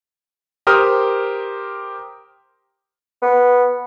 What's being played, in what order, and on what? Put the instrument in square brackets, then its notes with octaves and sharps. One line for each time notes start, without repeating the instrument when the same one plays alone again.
[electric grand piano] G4 A#4 C5 D#6 F6
[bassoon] B3